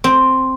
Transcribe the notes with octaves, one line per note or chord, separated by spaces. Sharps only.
C4